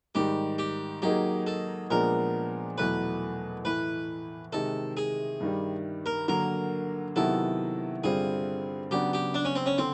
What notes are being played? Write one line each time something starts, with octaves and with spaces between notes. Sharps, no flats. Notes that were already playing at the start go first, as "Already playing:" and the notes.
G#2 D#3 G3 G4
G4
F#3 A#3 D#4 G4 G#4
A4
A#2 F3 G#3 B3 D4 A#4
E2 B2 F#3 A3 B4
A2 E3 A3 B4
C3 D#3 G#3 A4
G#4
G2 D#3 G3
A#4
D3 F#3 A#3 A#4
C3 D#3 F#3 B3 E4 A4
G2 D3 G3 C4 F4 G#4
C#3 F#3 B3 D4 G4
G4
D4
C#4
C4
C#4
D3 C4